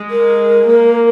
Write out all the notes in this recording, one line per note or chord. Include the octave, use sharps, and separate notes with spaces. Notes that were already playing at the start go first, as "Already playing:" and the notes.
Already playing: G#3
A#4
A#3